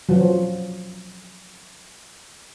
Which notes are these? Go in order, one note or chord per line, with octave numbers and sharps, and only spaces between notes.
F3 F#3